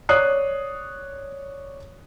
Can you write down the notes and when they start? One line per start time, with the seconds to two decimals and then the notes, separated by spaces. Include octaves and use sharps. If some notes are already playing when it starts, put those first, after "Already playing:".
0.09 C#5 D5 D#6 F#6 C7